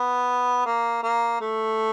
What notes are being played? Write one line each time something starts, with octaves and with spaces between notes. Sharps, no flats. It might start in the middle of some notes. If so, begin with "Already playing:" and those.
Already playing: B3
A#3
A#3
A3